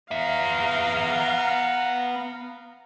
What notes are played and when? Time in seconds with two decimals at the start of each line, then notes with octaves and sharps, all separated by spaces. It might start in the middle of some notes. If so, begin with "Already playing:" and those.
0.11 B3 E5 F5 A#5